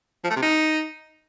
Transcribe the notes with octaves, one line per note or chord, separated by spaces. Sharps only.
F3
A3
C3
D#4